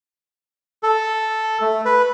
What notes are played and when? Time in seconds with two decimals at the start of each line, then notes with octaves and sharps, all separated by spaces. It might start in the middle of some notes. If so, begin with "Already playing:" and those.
0.83 A4
1.61 A3
1.85 B4